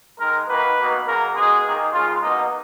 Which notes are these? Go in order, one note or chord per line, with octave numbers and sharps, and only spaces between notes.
D#3 G#3 A#4
D#3 F#3 A#3 B4
B2 F#3 A#3
C#3 F#3 A#3 A#4
B2 G#3 G#4
D#3 A#3
C#3 F3 G#3 F4
B2 F#3 A#3 D#4